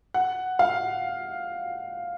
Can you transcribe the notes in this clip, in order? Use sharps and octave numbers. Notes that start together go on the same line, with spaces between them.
F#5
F5